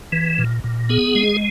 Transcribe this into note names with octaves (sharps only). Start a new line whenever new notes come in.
E3
A#2
A#2
B3 G#4
G#3